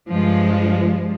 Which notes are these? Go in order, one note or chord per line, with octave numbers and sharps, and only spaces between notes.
G2 F3 G#3